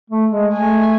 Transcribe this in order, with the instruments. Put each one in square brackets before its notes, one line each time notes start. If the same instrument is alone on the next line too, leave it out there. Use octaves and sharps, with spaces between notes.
[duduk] A3
G#3
[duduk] A3 [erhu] G#5